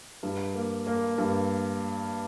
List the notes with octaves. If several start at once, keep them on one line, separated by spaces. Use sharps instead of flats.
G2
A#3
A#3
G2